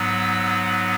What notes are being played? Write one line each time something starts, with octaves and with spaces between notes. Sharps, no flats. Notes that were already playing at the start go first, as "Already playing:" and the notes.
Already playing: G#2 F#3 B3 E6